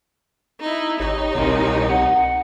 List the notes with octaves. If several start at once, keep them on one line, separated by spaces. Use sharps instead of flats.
D#4 E4
G#1 D#4 G4 C#5 D#5
C2 B2 C4 A#4
F#5